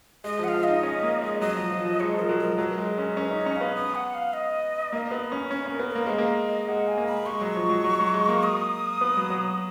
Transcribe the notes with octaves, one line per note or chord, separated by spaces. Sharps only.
G#3 D#5
F3 F#5
F5
F3
D#4 D#5
C#4
A#3
G#3
F#3 D#5
F3
F3
F3
G#3 C#5
F3 A#4
F#3
A#4
F3
F#3 A#4
B4
G#3 A#4
C#4
C#4 B4 C#5
D#4
D#5
C#5
C#4
F5
B3
D#6
F#5
F5
D#5
A#3
B3
C#4
C#4 C#5
C#4 A#4
B3
A#4
A#3
G#3 C#5
A#3 B4
D#5
G#3 F#5
G#5
A#3
B5
G#3 C#6
F#3
F3
F#3
F#3
F#3
G#3
A#3
D#6
B3
F#3
F#3